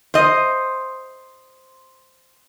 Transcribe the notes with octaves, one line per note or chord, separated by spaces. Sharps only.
C5 D#5